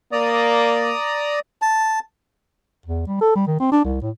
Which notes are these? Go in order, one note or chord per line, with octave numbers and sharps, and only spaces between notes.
A#3 D5 A#5 D#6
A5
E2
G3
A4
G3
D#3
C4
D4
C2
A2